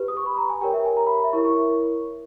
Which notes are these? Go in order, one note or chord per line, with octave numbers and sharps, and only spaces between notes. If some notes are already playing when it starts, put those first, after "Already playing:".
Already playing: G4 B4
D#6
C#6
B5
A#5
G#5
G4 A#4 C#5 G5
E5
G#5
A#5
B5
E5
E4 A#4 C#5 C#6
C#6